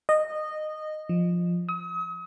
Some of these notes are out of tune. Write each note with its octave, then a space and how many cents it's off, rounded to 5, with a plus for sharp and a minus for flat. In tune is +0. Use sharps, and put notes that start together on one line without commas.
D#5 -15
F3 +0
D#6 +40